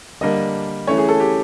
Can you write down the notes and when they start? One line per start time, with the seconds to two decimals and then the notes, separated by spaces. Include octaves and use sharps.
0.21 D3 G3 A#3 D4 D#5
0.87 E3 A3 C#4 C#5
0.98 G#4
1.08 A4
1.20 G4